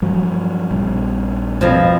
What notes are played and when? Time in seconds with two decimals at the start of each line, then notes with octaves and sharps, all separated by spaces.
0.02 G2 F3 F#3
0.71 A#1 G3
1.61 F2 B2 F3